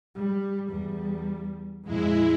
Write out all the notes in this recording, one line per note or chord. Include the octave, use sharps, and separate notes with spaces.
G3
E2 G3
F2 A#2 G#3 E4